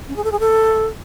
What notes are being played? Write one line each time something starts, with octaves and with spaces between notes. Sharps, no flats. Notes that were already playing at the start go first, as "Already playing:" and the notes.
C#4
G#4
A4
G#4
A4